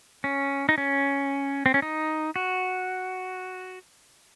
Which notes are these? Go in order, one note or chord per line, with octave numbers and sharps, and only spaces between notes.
C#4
D#4
C#4
C4
C#4
D#4
F#4